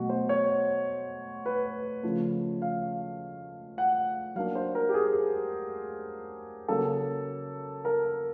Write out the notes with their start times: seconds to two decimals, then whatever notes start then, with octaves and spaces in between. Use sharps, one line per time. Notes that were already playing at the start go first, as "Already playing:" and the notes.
Already playing: B2 F#3 A3 F#4
0.09 C5
0.29 C#5
1.46 B4
2.03 C#3 F3 A3
2.62 F5
3.78 F#5
4.35 F#3 A#3 D4 F5
4.55 C5
4.75 A#4
4.89 G4
4.94 G#4
6.68 C#3 F#3 A#3 A4
7.85 A#4